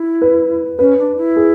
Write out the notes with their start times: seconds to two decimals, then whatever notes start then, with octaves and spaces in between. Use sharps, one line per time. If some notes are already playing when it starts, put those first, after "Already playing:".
Already playing: E4
0.22 B4
0.79 C#4 B4
0.98 D4
1.17 E4
1.36 G#4